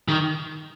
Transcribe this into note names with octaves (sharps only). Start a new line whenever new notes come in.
D#3